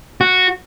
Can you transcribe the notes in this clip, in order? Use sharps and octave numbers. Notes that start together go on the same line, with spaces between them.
F#4